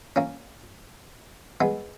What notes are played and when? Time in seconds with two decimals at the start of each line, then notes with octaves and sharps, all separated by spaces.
0.16 A#3 C#4
1.61 G#3 B3